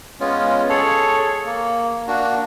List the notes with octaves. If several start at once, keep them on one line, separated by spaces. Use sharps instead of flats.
G#3 B3 C#4 F4
G#4 A4 C#5
A#3
A#3 D4 F#4